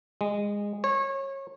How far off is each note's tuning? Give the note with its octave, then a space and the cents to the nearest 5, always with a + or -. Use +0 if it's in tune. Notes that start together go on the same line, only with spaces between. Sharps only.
G#3 -20
C#5 -30